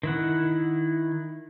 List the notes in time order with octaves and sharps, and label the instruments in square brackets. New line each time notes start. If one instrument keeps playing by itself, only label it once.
[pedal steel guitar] D#3 E4 F#5